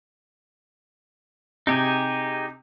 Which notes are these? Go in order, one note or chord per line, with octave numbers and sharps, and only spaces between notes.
C3 D#4 G4 G#4